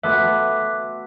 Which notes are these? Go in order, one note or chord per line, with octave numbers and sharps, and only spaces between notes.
A3 B3 F#4 E5 C6 D6 F#6